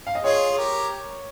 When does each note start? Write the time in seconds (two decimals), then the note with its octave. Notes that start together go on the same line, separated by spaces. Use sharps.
0.07 F5
0.15 D#5
0.23 F4 G#4 C#5
0.51 G#4
0.58 G4 A#4